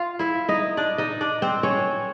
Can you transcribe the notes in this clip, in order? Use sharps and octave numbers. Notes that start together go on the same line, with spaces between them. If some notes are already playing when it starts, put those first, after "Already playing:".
Already playing: F4 F5
E4 E5
D#4 D#5
D4 D5
D#4 D#5
D4 D5
C4 C5
C#4 C#5